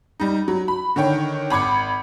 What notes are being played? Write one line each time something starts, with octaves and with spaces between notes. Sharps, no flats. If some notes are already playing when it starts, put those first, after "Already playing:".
G3 D#4
F#3
B5
D3 D#3 C#5 G5
G#1 B5 D6 G#6 C#7